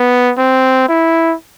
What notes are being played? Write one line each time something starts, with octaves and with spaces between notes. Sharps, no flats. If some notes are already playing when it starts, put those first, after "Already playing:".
Already playing: B3
C4
E4